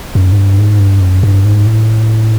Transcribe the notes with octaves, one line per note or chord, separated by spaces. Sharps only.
F#2
G#2
G2
G#2
G2
F#2
G2
G#2
A2